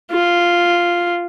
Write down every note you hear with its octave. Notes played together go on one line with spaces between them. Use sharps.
F4